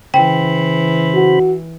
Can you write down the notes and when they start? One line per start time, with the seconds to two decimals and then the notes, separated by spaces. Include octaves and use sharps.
0.14 C#3 E3 C5 G5 B5
1.15 F#4